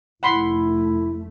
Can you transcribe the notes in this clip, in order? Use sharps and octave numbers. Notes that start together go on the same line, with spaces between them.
F1 A3 E4 F#5 B5 C6